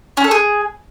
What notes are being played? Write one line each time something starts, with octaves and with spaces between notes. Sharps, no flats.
C#4
A4
G#4